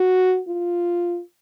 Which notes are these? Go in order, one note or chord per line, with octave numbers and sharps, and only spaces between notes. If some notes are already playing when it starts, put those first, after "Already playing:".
Already playing: F#4
F4